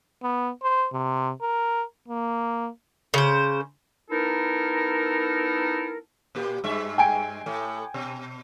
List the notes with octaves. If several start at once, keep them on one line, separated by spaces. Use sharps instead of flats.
B3
C5
C3
A#4
A#3
C#3 C5
B3 D#4 E4 A4 A#4
A#2 A#3 G4
G2 G#3 E5
G5 G#5 D7
A2 A3
B2